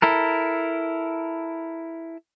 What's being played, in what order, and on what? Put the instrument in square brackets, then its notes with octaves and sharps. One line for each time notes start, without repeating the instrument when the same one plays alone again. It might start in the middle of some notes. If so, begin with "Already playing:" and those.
[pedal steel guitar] E4 A4 A#4